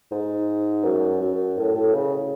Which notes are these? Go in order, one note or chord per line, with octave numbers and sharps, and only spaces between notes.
G#2
F#2
F#2
A2
A2
C#3